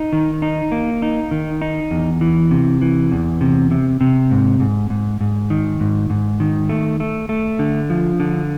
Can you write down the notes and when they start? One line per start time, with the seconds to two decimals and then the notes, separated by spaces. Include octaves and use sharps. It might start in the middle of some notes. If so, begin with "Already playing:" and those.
Already playing: D#4
0.13 D#3
0.42 D#4
0.72 A#3
1.02 D#4
1.31 D#3
1.62 D#4
1.91 E2
2.21 E3
2.51 C3
2.82 E3
3.12 E2
3.41 C3
3.71 C3
4.01 C3
4.31 G#2
4.60 G#2
4.90 G#2
5.21 G#2
5.50 D#3
5.80 G#2
6.10 G#2
6.40 D#3
6.69 A3
7.00 A3
7.29 A3
7.59 D3
7.90 F3
8.20 D3